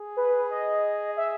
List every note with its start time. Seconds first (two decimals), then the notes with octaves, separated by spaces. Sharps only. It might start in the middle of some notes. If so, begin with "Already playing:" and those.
Already playing: G#4
0.17 B4
0.51 D#5
1.17 E5